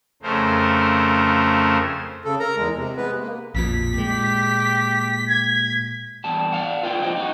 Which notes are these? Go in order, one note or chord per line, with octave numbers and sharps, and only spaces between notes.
F2 C#3 A3 A#4 C5
C#3 A4
A#4 A#5
E2 G#3
C3
G#3 B3 B4
A#3
A#1 F2 A#2 B6
A#2 G#3 G4
G#6
E2 G3 A5
D5 F5 F#5
F4 B4 D5 F5 G5
F2 G4 C5 D#5 G5
D#4 F#4